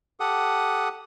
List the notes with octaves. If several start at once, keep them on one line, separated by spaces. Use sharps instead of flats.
G4 A4 F#5 D#6